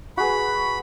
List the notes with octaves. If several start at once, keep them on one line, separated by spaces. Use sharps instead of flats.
F#4 G#4 B4 B5